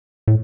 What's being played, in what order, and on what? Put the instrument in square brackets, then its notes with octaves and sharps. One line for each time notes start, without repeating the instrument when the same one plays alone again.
[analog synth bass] A2